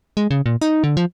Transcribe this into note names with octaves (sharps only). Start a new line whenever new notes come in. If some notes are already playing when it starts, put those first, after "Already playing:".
G#3
C#3
A#2
D#4
D3
F3